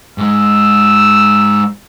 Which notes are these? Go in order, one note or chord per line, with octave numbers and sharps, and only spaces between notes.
G#2 G#3 E6